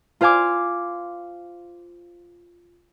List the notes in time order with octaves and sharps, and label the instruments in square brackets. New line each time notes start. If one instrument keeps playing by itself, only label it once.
[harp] F4 C5 F5 G#5 D6